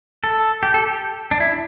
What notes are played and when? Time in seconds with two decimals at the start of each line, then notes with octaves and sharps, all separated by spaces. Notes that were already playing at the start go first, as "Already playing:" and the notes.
0.24 A4
0.63 G4
0.74 A4
0.87 G4
1.31 D4
1.40 E4